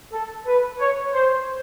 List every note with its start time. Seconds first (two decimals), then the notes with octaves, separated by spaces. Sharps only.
0.13 A4
0.47 B4
0.80 C#5
1.13 C5